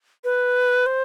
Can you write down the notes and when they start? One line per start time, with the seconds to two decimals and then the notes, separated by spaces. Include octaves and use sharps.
0.24 B4
0.86 C5